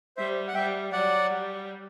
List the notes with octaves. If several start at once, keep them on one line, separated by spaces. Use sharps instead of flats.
G3 C5 E5
F#5
G3 E5 G5
F#3 D5 F#5
G3